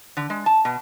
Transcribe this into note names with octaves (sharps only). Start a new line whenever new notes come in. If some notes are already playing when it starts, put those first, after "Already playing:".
D3
G#3
A5
B2